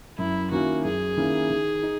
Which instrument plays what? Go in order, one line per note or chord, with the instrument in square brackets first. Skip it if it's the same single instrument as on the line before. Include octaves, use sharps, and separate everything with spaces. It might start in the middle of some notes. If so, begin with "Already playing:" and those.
[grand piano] F#2 [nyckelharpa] E4
[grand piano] D#3 A#3 C#4 E4 [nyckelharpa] F#4
[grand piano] F#2 [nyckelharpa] G#4
[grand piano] D#3 A#3 C#4 E4
D#3
D#4